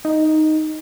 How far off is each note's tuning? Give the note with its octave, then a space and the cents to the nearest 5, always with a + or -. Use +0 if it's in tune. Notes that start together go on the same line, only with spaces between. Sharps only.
D#4 +0